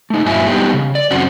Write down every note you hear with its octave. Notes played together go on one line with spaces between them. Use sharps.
A3 D#4
G2 A#2 F#3 E4 G#5
G3 B3 D#4 G4
C#3
D5
F#2 C#3 C4 F#4